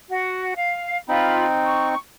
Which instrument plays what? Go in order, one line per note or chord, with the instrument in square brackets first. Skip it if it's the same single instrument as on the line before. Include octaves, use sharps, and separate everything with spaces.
[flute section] F#4
F5
[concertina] C4 D#4 [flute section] F4 B5
[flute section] C#6